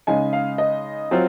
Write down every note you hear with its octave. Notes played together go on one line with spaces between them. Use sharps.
C#3 G#3 D#4 G#5
F5
D#5
F#3 C4 F4